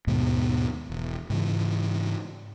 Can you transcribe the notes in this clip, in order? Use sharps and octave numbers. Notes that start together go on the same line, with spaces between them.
D#2 G#2 B2
E1
G#2 C#3 E3